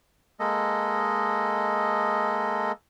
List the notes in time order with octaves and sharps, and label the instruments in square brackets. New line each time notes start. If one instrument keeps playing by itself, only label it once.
[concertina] G#3 A#3 A4 D#5